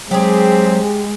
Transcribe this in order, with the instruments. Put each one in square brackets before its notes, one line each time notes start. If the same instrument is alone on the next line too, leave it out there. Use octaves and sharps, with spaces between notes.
[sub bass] F#3 [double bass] G#3 [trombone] C4 [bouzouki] G4 G#4